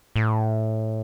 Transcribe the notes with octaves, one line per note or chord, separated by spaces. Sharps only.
A2